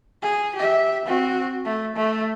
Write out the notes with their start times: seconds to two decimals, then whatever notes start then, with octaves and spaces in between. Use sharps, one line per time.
0.22 G#4
0.56 G4 E5
1.05 C4 F#4
1.65 A3
1.96 A3